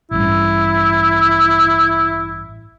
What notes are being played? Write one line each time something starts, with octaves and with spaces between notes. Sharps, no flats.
A1 G2 E4